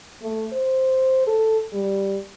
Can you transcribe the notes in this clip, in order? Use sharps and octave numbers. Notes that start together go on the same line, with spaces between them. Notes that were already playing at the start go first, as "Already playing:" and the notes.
A3
C5
A4
G3